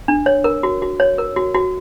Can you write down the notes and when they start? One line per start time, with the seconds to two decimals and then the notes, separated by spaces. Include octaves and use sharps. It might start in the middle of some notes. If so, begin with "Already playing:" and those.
0.08 D4
0.26 C#5
0.44 A#4
0.63 F#4
0.82 F#4
1.00 C#5
1.18 A#4
1.36 F#4
1.54 F#4